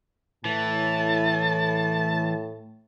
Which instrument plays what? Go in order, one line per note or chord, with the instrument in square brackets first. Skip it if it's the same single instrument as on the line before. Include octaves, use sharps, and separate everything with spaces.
[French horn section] A2 [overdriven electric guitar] E3 [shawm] A5